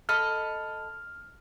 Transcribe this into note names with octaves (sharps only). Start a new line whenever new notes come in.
A4 D#5 B5 F6